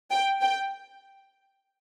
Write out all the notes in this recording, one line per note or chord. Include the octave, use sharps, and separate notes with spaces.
G5
G5